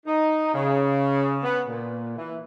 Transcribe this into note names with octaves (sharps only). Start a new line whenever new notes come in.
D#4
C#3
B3
A#2
E3